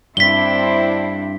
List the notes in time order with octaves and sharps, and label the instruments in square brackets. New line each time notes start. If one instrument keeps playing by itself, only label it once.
[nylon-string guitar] G2 [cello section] C4 D4 E4 [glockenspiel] B6 G7